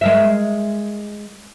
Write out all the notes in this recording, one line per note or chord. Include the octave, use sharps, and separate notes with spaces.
G#3 A#4 E5